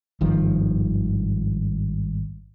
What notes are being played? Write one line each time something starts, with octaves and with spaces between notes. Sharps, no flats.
G#1 G2 D#3 F3